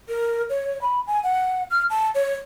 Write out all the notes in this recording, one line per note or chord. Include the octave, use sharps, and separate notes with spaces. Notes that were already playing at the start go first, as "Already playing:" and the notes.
A#4
C#5
B5
G#5
F#5
F6
A5
C#5